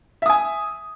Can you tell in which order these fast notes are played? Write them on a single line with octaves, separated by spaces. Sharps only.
E5 D#6 G#5